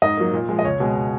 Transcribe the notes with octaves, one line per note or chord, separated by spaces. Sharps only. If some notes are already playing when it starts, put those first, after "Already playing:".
G#2 D#5
F#3 A#3
A#2
F3 G#3
D#5
C#2 C#5
B2 G#3